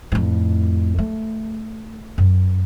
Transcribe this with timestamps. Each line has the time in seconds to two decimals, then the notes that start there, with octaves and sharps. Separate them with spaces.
0.12 F2 A2
0.98 A3
2.18 F#2